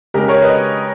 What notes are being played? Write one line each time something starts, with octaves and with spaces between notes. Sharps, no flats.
C#3 G#3 G4 A#4
A#4 C#5
B4 D#5